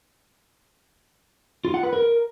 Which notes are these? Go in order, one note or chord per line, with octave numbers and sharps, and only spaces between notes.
F4
F#5
B4
A#4